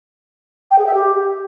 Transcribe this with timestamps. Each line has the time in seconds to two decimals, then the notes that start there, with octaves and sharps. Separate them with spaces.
0.71 G5
0.78 G#4
0.86 E5
0.94 G4